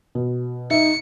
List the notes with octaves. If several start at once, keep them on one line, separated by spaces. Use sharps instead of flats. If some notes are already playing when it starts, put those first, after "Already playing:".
B2
D#4 E5 C#7